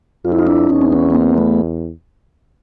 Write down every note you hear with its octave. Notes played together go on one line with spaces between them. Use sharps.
F2 F4
E4
D#4 F4
D4 E4
E2 C#4 D#4
C4
B3 C#4
B3
A#3 C4
A3 B3